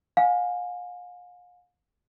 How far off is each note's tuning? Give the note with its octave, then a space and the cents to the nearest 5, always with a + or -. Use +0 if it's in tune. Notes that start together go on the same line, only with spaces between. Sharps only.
F5 +40 G#5 +0